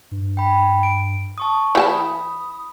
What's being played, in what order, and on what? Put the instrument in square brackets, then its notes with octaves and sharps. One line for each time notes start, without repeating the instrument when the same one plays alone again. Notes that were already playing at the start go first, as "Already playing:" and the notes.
[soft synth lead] G2
[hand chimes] G5 B5
D7
A5 C#6 D#6
[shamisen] E3 G4 A5 [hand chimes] B5 [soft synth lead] D#6